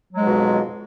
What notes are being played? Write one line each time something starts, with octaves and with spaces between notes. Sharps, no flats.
F2 G#2 B2 F#3 G#3